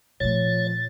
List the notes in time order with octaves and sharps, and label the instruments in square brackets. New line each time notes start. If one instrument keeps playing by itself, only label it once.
[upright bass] A#2 A3 [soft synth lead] F3 [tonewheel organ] C#5 [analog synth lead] A6